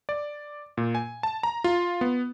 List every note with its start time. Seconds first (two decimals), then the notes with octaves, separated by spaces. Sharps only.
0.09 D5
0.77 A#2
0.95 G#5
1.23 A5
1.43 A#5
1.64 F4
2.01 B3